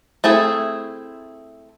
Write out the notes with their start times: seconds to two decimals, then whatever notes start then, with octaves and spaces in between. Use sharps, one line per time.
0.24 A3 C4 E4 G#4